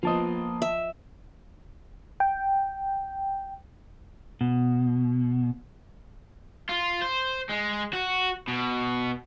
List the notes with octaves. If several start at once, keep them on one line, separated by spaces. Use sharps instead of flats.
F3 A#3 B3 F4 C5 D#5 A5 D#6
E5
G5
B2
F4
C5
G#3
F#4
B2